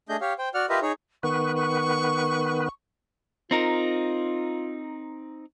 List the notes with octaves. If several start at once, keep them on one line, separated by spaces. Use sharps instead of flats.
A3 D4 G#4 D#5 G6
G4 C#5 F5
C5 G5
F#4 D5 F#5 F6
F4 G4 A#4 B4 D#5 E5
D#4 G#4 C#5
D#3 B3 B4 C#6
C#6
C4 D#4 F4 A#4